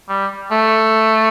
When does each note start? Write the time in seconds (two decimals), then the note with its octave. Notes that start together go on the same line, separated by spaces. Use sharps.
0.08 G3
0.51 A3